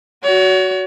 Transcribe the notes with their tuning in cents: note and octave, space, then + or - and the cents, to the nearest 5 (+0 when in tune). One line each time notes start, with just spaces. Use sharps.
F#4 +5 C#5 +40